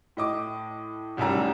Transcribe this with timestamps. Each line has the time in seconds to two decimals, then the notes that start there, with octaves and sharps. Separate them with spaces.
0.17 A2 D#5 D6
1.17 F1 C2 F#2 D#3 G3 A#5